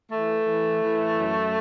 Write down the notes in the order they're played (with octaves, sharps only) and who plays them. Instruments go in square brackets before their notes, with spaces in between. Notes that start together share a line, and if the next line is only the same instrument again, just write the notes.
[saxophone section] E3 A3
E3
E3
F#2